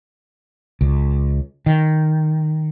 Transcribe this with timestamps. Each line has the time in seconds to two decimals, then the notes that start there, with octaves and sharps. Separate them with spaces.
0.81 C#2
1.66 D#3